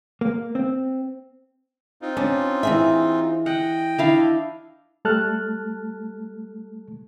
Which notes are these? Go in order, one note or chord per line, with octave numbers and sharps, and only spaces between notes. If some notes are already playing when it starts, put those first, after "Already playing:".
A#3
C4
C4 D#4 F4
C#4 D4
E3 G#4 E5
D#5 F#5 G5
D4 E4 F5
G3 A3 A4 A5 F6 F#6